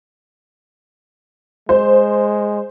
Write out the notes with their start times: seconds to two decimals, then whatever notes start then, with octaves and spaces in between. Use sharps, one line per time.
1.69 G#3 C5